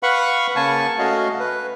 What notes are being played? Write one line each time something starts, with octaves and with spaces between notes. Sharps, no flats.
B4 F5 F#5 B5 C#6
C#3 A#3 G#5 A5 C#6
A3 C#4 F#4 D#5 F5
B4